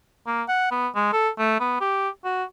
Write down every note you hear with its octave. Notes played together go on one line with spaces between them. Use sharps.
A#3
F#5
B3
G#3
A4
A3
B3
G4
F#4